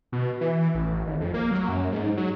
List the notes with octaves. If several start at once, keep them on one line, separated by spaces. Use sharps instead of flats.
B2
E3
A1
A1
G#1
F2
A#3
F#3
F#2
G#2
F#3